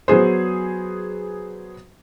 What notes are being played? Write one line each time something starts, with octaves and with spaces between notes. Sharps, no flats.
F#3 B3 G#4 C5